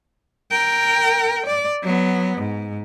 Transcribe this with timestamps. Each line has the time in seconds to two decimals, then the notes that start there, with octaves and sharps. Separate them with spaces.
0.51 A#4 G5
1.47 D5
1.83 F#3 B3
2.38 G#2